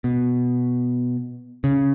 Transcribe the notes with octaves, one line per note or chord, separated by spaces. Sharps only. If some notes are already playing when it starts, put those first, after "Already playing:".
B2
C#3